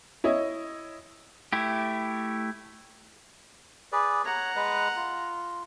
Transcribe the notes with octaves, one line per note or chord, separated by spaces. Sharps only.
E4 C#5 D#5
A3 E4 G4
G#4 B4 D5
C#5 F#5 A#5
G#3 B4
F4